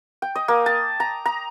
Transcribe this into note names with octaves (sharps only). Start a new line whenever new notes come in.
G5
D#5
A#3
A5
A#5
A#5